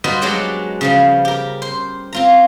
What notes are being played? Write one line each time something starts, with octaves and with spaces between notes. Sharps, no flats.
G3 B3 D#4 F#4 C5 D#5
F#3 G#3 D4 G4 C#5 D5
C#3 F3 G3
G4 A#4
C5
C4 F4 A#5